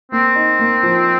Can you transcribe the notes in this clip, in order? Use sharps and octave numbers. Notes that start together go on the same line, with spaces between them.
A#3 C4
D#4
A#3
F3